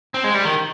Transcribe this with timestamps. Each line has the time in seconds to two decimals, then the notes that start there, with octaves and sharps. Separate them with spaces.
0.14 C4
0.24 G#3
0.34 G3
0.45 D#3